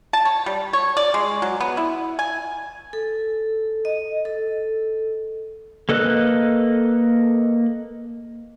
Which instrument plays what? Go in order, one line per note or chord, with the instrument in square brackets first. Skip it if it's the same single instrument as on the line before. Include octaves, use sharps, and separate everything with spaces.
[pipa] A5
C#5
G3
C#5
D5
G#3
F#3
B3
E4
G#5
[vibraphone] A4
D#5
A4
[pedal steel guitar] A#3 A4 B4 D#5 F#6